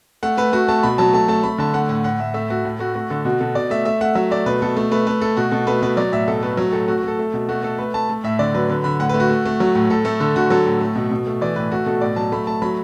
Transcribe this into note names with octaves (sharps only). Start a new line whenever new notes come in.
A3 F#5
A3 B4
A3 F#4
A3 A5
B2 B5
F#3 A5
A3 A5
A3 A5
A3 B5
D3 A5
A3 F#5
A2 F#5
A2 F#5
A2 E5
A3 E5
A3 F#4
A2
A3 F#4
A3 F#4
D3 A4
B2 F#4
B2 A4
B2 D5
A3 E5
A3 E5
A3 F#5
F#3 E5
A3 D5
B2 B4
B2 A4
A3
A3 B4
A3 B4
A3 A4
B2 F#4
B2 A4
A3 B4
B2 B4
F#3 D5
A2 E5
B2 A4
A3 B4
F#3
A2 A4
A3 F#4
F#4
A3 A4
A3
B2
A3 F#4
A3 A4
A3 B4
A3 A5
A3
A2 E5
D3 D5
F#3 B4
D3 B4
D3 B5
A2 F#5
B4
A3
F#4
A3
A3
F#3
A2
A2 A4
A3 A4
D3 A4
D3 F#4
F#3 A4
A2
A3
B2
B2
A3
E3 D5
A2 B4
A3 F#4
B2 A4
A2 D5
F#3 A5
A3 B5
A3 A5
F#3 B5